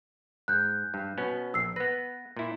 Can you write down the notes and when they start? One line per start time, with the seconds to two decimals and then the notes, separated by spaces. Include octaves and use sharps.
0.48 G#2 F#6 G6
0.94 G2
1.18 B2 B3 C#4
1.54 A#1 E6 C7
1.76 B3 B4 A#6
2.37 A#2 E4